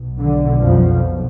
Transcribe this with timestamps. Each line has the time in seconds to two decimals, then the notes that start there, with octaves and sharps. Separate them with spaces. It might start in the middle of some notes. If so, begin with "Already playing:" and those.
Already playing: B1 B2
0.18 D3
0.60 F2 F3